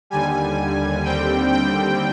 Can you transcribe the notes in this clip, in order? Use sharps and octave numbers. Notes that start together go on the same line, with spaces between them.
D#2 D3 G3 G#5
D#2 D3 G3 C4 G5
G5